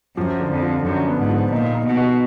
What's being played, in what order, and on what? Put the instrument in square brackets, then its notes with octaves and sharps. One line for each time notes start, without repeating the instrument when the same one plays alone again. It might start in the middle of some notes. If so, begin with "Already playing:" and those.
[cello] F#2 [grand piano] F3
[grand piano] D3
[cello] F2
[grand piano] F3
[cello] F#2 [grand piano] D3
[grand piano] B3
[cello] G#2
[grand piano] F3
[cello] A#2 [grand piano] D#4
[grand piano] D#4
[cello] B2
[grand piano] F#4